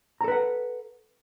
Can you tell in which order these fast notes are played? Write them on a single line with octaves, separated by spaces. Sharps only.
A#5 A4 B4 F#5